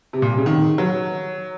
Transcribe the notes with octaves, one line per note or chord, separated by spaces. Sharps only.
C3
A#2
C3
C#3
D#3
F#3